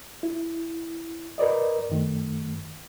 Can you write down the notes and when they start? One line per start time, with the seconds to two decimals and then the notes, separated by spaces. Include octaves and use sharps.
0.23 E4
1.38 A#4 B4 D5 D#5
1.90 F#2 D#3 A3